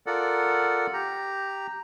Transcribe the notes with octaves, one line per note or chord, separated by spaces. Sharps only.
F4 A4 A#4 D5 F#5
G4 A#5